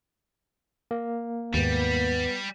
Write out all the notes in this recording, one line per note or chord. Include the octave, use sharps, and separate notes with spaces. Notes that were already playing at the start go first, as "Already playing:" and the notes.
A#3
D#2 G#2 G3 B3